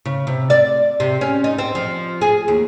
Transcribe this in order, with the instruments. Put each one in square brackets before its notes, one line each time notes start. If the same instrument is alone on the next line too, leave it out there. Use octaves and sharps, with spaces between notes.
[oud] C#3
C3
D5
C3
C#4
D#4
C4
F3
G#4
D#2